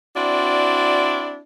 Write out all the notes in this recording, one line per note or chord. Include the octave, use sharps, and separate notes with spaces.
C4 D4 E4 F#4 D5